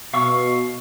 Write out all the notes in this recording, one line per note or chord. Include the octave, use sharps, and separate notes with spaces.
B2 F5 C#6 E6